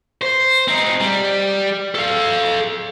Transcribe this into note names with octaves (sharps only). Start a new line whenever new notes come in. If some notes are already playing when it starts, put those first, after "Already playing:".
C5
C4 D#4
G3
A4 F5